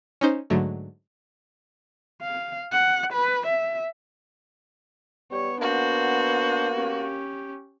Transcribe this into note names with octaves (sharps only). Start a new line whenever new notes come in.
C#4 D#4 C5
G#2 D3 F#3 A3
F5
F#5
B4
E5
G3 B3 C#5
A#3 D4 F#4 C5
C#4 G4